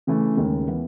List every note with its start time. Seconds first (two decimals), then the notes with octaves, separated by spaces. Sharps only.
0.07 C#3 E3 A3
0.37 D#2 C#3 G#3
0.67 E3 B3